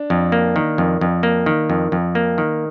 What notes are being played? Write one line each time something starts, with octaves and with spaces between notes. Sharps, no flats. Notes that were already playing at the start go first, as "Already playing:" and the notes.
Already playing: D4
F2
A#3
D#3
F2
F2
A#3
D#3
F2
F2
A#3
D#3